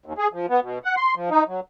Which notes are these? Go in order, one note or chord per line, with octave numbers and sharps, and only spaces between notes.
D#2
G#4
F3
B3
B2
F#5
C6
F3
D#4
F#3